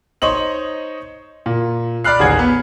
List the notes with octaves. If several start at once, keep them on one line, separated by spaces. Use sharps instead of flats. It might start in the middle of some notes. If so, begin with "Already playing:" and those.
D#4 C5 C#5 D#5 F#7
A#2
D5 B5 F6 F#6 C7
A1 D#2 G#4 F#5 G#6
B3